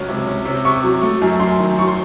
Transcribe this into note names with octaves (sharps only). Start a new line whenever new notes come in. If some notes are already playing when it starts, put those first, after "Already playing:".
Already playing: C#2 F#3 C#4
C3
C#4
C3
C3 C#6
F#3
A3
F#2
F#2 C6
D#3
F#3 C#6
C6